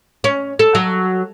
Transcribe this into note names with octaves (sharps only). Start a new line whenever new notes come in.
C#4
A4
F#3